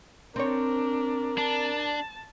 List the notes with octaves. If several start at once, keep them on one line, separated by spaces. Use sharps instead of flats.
C4 D4 A#4 C#5
D4 A5